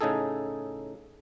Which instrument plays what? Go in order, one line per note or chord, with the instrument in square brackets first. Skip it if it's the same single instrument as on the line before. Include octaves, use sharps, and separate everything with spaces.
[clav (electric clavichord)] A2 C#3 D#4 G#4 A4